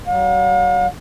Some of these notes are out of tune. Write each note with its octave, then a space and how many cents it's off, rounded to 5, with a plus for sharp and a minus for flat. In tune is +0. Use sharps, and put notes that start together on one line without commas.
F#3 +45 F5 +45